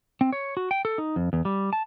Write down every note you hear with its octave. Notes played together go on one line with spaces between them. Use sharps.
C4
C#5
F#4
G5
A4
D#4
F2
E2
G3
A5